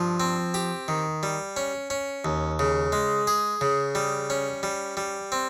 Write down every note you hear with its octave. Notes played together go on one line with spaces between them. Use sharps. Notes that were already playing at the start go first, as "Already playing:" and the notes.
Already playing: G2 F3
C4
G4
D#3
G3
C#4
C#4
D#2
C#3
G#3
G#4
C#3
G3
C#4
G3
G3
C4